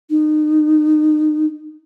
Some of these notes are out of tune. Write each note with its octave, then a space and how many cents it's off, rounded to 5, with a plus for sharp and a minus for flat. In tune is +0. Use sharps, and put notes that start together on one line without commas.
D#4 -30